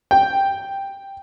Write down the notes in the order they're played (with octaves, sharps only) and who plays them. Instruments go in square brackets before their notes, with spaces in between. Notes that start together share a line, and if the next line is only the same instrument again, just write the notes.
[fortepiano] G5